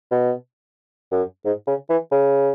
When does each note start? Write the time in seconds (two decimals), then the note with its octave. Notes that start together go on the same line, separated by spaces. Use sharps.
0.11 B2
1.12 F#2
1.45 G#2
1.67 C#3
1.90 E3
2.12 C#3